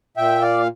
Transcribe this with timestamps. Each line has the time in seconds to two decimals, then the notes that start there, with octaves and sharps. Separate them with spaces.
0.17 A#2 E5 G5
0.41 D5 F5